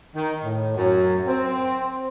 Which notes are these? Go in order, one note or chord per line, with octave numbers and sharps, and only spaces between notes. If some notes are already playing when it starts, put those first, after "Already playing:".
D#3
A2
F#2
C4